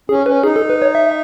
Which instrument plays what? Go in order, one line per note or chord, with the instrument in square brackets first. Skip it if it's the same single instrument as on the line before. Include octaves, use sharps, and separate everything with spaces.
[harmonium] C#4 [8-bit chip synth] G#4
[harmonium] C#4 [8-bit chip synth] B4
[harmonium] D#4 [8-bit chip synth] G#4
[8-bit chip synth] A4
B4
C#5
E5